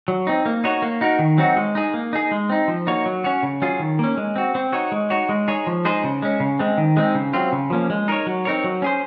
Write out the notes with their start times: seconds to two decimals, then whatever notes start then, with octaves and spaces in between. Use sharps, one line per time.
0.08 F#3
0.27 C4 D#4
0.46 A#3
0.64 D#4 F#4 C#5
0.82 A#3
1.01 D#4 F#4 A#4
1.19 D#3
1.38 F#3 C4 D#4 F#4
1.57 G#3
1.75 D#4 G#4
1.94 A#3
2.13 D#4 G#4
2.31 G#3
2.50 C4 D#4
2.68 F3
2.87 A#3 D#4 F#4 C#5
3.06 F#3
3.24 C#4 F#4 C#5
3.43 C#3
3.62 F#3 C#4 F4 G#4
3.79 D#3
3.99 A#3 C#4
4.17 G#3
4.36 C4 F#4
4.55 C4
4.73 D#4 F#4 C#5
4.92 G#3
5.10 D#4 F#4 C#5
5.29 G#3
5.48 D#4 G#4 C#5
5.67 F3
5.85 G#3 D#4 G#4 C5
6.04 C#3
6.22 G#3 C#4
6.40 C#3
6.59 G#3 C4
6.78 D#3
6.97 G#3 C4 D#4
7.15 C#3
7.33 F#3 C4 F4
7.52 C#3
7.70 F3 A#3 C#4
7.90 G#3
8.08 D#4 A#4 C#5
8.27 F#3
8.45 C4 D#4 A#4 C#5
8.64 F#3
8.82 C#4 G#4 C5